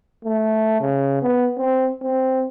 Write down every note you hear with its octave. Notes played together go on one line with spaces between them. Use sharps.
A3
C#3
B3
C4
C4